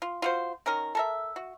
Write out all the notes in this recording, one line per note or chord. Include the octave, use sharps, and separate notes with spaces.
F4
F4 F#4 C5
D#3 C#4 A#4
A4 A#4 E5
F#4